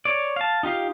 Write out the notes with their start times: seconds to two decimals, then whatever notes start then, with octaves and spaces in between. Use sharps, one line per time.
0.05 C#5 D5
0.36 F5 A5
0.63 D#4 F4 G4 F5